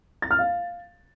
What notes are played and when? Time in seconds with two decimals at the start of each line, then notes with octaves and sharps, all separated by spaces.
0.22 A6
0.31 F6
0.39 F5